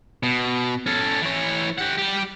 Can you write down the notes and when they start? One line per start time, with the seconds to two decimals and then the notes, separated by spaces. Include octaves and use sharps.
0.23 B2
0.86 C#4 A4
1.22 E3 C#5
1.78 G4 F#5
1.99 G3 G4